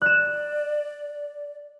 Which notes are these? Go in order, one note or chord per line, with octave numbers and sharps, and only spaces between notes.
D5 F#6 E7